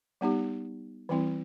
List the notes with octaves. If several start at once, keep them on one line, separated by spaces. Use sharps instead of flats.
G3 B3 D#4 G4
E3 G3 C4 E4